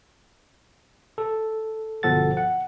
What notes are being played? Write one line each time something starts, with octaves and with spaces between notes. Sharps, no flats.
A4
G1 B2 F3 A4 F#5 A6
F#5